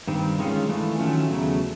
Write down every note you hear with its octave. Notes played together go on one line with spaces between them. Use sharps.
G2 D#3 G3 C4
D#3 G#3 C#4 F4
E3 A3 D4
D#3 F#3 A3 C#4 F4
E2 C#3 F#3 A3